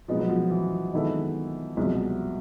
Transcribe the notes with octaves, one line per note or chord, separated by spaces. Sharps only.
B2 F3 G#3 B3 D#4
F#3
F3
E3
D#3 G#3 B3 E4 A4
C2 B2 F3 G#3
F#3
F3